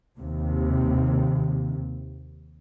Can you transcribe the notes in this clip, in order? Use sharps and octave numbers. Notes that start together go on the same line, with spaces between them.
D#2 C3